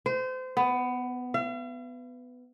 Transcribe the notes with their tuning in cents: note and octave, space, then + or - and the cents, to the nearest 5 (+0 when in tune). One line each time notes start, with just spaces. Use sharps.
C5 -30
B3 +15
F5 -45